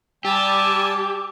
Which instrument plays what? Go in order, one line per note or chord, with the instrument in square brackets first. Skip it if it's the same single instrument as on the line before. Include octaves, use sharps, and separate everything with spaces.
[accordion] G3 A5 [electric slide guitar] G4 [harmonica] G#5 E6 [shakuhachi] D6